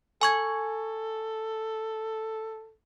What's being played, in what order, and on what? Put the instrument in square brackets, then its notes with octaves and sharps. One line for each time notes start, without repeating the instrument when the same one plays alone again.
[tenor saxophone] A4 [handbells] G#5 C#6 G#6